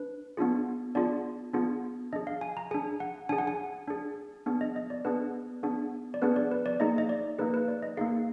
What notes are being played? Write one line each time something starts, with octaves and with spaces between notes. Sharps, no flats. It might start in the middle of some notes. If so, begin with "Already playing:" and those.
Already playing: D4 B4
B3 D4 F4 G#4
B3 D4 F4 G#4 D5
B3 D4 F4 G#4
D4 G#4 D#5
F5
G#5
A#5
D4 G#4 G#5
F#5
D4 G#4 G#5
F#5
G#5
D4 G#4
B3 D4 G#4
D#5
D#5
D5
B3 D4 G#4 B4
B3 D4 G#4
D5
B3 D4 G#4 B4
D5
B4
D5
A#3 D#4 G#4 D#5
D#5
D5
A#3 D#4 G#4 B4
B4
D5
D#5
A#3 D#4 G#4 F5